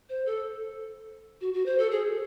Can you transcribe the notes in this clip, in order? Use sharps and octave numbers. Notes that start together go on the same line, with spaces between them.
C5
A4
F#4
F#4
C5
A4
G#4